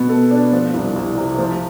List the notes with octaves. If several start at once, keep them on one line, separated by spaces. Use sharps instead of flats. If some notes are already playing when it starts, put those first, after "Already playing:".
Already playing: B2 B3
A4
D4
F3
C2
C2
C3
F3